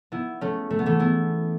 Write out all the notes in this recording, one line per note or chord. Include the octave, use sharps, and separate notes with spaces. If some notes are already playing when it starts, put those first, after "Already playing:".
B3 E4
A3 C#4
A3
B3
E3 A3
B3 E4